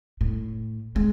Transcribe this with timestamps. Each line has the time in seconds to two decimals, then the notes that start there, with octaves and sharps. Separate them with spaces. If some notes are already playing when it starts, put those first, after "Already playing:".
0.21 A2
0.96 G#3